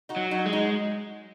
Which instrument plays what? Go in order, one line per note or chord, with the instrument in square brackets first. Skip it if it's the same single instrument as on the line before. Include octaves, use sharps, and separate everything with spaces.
[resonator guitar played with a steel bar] D#4 F#4
[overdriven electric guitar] F#3
[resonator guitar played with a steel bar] D#4 F#4
[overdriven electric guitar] G#3
[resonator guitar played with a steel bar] D#4 F#4